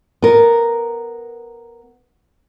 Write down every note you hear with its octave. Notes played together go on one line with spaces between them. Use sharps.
B3 A#4